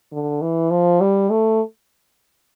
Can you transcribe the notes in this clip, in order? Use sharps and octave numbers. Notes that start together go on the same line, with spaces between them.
D3
E3
F3
G3
A3